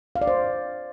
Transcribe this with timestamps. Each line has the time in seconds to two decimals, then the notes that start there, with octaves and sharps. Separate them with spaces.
0.16 F5
0.21 D5
0.27 C5